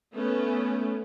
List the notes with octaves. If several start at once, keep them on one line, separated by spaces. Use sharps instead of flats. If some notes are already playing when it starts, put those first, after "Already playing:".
A3 B3 C#4